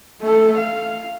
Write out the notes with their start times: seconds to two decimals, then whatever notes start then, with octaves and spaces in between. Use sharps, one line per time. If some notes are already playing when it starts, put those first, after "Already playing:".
0.22 A3 A4
0.57 F5